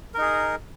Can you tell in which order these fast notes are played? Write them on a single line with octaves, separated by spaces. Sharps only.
A#4 D#4 G#4